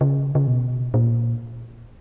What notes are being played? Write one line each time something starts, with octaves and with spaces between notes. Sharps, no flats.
C#3
C#3
B2
A#2